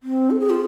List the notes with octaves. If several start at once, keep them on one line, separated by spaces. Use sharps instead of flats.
C4
A4
G#4
F4